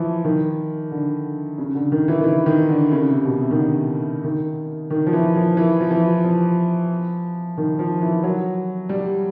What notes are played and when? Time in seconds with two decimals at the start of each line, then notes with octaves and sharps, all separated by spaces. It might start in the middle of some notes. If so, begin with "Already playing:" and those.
Already playing: E3 F3
0.24 D#3
0.91 D3
1.58 C#3
1.75 D3
1.92 D#3
2.08 E3
2.20 D#3
2.24 E3
2.46 D#3
2.69 D3
2.92 C#3
3.08 C3
3.24 B2
3.41 C3
3.51 D#3
3.58 D3
4.24 D#3
4.90 D#3
5.06 F3
5.13 E3
5.36 F3
5.57 E3
5.80 F3
5.91 E3
6.24 F3
7.57 D#3
7.79 F3
8.02 E3
8.23 F#3
8.89 G3